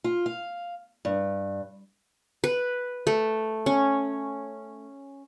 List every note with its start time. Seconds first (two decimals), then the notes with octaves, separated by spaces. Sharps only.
0.04 F4
0.26 F5
1.05 G2
2.44 B4
3.07 A3
3.66 C#4